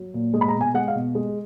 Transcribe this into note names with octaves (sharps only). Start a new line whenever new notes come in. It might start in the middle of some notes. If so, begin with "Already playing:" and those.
Already playing: F#3
A#2
G#3
B5
A#5
B2
G#5
G#3 F#5
F5
B2
G#3